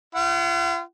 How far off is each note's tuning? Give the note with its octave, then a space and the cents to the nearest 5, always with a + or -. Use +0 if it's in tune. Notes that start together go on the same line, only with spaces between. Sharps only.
F4 -40 F#5 +30